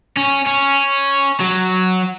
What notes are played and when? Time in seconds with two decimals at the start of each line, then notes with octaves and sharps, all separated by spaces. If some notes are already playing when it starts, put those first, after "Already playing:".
0.17 C#4
0.47 C#4
1.40 F#3